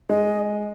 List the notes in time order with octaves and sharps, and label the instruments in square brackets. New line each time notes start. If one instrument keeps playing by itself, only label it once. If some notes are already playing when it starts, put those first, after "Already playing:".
[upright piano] G#3 [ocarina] D#5